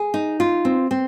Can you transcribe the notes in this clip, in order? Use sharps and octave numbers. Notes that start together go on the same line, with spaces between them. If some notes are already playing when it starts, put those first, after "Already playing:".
Already playing: G#4
D#4
F4
C4
C4